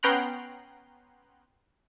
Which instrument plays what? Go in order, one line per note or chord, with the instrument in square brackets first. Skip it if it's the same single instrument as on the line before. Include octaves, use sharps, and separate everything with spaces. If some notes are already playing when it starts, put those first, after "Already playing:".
[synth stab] B3 C#4 G5 A#5 C6 F#6